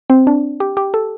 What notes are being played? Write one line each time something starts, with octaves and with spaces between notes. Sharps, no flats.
C4
D4
G4
G4
A4